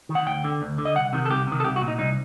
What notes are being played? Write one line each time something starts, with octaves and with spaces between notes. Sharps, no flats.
D#3
F#5
D2 G5
D3
D2
D3
D#5
C2 F#5
C3 D#3
A4
C2 G4
C3 D#3
A4
C2 G4
F#4
A#2
D#4
C2 D#4